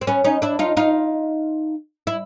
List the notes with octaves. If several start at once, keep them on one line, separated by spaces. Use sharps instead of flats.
C4
B3 C#4
C#4 D#4
D4 E4
D#4 F4
D#4 F4
E4